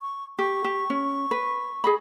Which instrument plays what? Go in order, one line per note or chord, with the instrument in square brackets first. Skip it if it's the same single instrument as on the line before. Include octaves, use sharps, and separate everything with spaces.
[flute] C#6
[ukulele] G4 [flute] C#6
[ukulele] G4
C#4
B4
G#4 D#5 B5